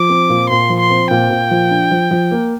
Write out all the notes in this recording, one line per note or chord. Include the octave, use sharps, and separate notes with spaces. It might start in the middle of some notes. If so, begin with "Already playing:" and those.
Already playing: F3 D6
C4
A#2
A#2 C6
F3
C6
C4
A#2 G5
A#2
F3
D4
F3
F3
A#3